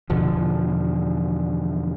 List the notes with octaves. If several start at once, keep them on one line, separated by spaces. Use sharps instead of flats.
E2 B2 D3 F3